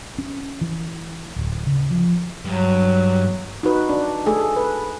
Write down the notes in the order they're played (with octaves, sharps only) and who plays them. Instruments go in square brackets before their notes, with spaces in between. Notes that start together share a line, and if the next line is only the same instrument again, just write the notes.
[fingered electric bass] C#4
E3
D1
C#3
F3
[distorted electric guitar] G2 [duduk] F#3
[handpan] D#4 F#4 B4
D4
A3 G#4 A4
B4